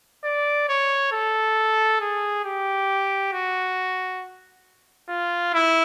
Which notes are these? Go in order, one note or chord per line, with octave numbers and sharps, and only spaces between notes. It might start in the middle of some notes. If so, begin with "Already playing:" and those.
D5
C#5
A4
G#4
G4
F#4
F4
E4